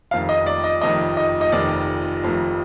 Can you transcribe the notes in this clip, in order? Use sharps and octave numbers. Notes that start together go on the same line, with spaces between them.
F1 F2 D#3 F5
D#5
D5
D#5
F1 F2 D#3 D#5
D#5
D#5
F1 F2 D#3 D5
F1 F2 D#3